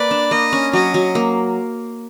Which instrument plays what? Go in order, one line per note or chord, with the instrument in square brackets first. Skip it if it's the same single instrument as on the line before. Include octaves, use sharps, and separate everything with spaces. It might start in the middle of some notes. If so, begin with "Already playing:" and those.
Already playing: [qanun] A#3 B4 [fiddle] D5
[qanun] D4
[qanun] A#3 [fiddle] D#5
[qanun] C#4
[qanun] F#3 [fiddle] D#5
[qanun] F#3
A#3